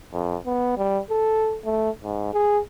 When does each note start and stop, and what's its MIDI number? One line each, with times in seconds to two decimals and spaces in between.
0.13 0.36 41
0.46 0.73 59
0.77 0.99 55
1.10 1.58 69
1.65 1.90 57
2.03 2.32 44
2.33 2.59 68